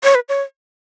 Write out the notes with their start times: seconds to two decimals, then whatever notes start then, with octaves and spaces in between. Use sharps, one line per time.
0.04 C#5
0.15 B4
0.29 C#5